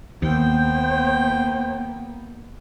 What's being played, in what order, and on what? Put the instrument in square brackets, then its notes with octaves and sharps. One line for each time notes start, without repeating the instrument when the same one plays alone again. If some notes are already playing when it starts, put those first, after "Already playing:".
[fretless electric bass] D#2 [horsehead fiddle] A#3 B3 [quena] C5 [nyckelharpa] G5